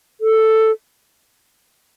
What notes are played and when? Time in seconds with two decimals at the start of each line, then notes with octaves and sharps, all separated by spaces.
0.21 A4